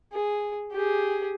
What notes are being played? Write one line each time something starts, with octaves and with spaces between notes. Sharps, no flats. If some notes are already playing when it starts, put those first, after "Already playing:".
G#4
G4 G#4